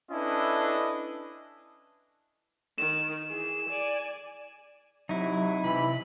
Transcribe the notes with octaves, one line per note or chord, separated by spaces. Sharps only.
C#4 D4 E4 A4 B4 D#5
D#3 E7
E3 G#4
D5 G#5
C3 F#3 D#4 E4
C3 E3 B5